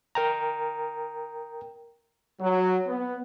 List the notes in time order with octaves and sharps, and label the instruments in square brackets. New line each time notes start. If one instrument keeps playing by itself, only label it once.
[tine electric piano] A#4 G5 A#5
[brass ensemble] F#3
B3